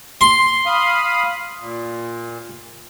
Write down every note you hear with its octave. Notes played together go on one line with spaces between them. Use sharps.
C6
F5 B5 D#6
A#2